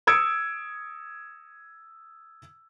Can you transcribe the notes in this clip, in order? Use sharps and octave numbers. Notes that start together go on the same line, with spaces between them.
D#6 E6 G#6 C#7 D7